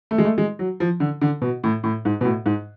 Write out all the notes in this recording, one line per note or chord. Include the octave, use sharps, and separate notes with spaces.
A3
G#3
A3
G#3
F#3
F3
D3
D3
B2
A2
A2
G#2
B2
A2
G#2